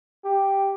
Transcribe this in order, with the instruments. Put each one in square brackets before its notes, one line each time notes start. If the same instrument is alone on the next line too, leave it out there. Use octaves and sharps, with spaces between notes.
[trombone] G4